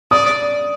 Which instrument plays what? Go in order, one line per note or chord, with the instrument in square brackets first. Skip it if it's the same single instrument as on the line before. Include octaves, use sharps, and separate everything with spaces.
[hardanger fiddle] D5 [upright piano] D#6